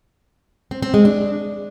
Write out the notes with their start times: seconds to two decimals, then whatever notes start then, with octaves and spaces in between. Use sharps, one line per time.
0.71 C4
0.82 C4
0.94 G#3
1.05 D4